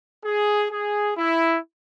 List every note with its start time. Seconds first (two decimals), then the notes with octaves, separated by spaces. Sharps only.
0.23 G#4
0.69 G#4
1.15 E4